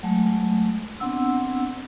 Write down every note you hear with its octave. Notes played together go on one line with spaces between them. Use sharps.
F#3 G#3 A3
B3 C4 D4 F#5 E6